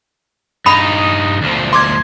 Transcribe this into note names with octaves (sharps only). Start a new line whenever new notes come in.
G2 D#4 B5 D#6
D2 F3
C6 D6 G#6